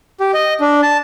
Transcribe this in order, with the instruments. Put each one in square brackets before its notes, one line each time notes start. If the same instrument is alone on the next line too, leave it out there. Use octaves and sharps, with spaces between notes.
[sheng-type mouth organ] G4
D#5
D4
A5